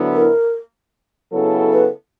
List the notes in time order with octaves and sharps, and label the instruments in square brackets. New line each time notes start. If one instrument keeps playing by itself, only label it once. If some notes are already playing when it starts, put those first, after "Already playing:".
Already playing: [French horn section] D2 D3 F#3 B3 E4
[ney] A#4
[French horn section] C#3 F#3 B3 E4 A4
[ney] B4